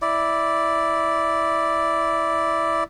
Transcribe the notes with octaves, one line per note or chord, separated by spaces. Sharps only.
E4 D5